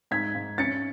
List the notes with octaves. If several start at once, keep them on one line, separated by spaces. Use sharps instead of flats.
G#2 G#6 B6
G#2
C#4 A6 C#7